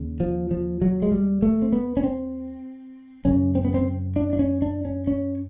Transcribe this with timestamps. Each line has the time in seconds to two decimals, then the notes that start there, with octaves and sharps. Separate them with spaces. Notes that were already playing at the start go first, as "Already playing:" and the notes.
Already playing: D#2 C#3
0.20 F3
0.51 F3
0.82 F#3
1.02 G#3
1.12 G3
1.42 A3
1.62 C4
1.72 B3
1.97 C#4
2.04 C4
3.25 F#2 C#3 C#4
3.55 C4
3.64 B3
3.74 C4
4.16 D4
4.33 D4
4.39 C#4
4.62 D4
4.85 C#4
5.07 C#4